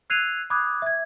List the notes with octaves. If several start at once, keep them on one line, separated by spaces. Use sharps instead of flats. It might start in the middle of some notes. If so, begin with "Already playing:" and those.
E6 F#6 G#6 C7 D#7 F7
B5 D6 D#6 F#6 G#6
E5 G#6